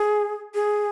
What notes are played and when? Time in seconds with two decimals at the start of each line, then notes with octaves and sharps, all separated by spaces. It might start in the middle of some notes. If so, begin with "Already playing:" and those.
Already playing: G#4
0.54 G#4